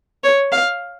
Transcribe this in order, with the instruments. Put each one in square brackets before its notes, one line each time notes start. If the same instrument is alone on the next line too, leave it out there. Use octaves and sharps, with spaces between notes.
[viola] C#5
F5